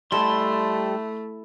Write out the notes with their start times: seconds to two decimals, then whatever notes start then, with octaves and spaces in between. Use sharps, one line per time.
0.12 G3 A3 E4 A4 C6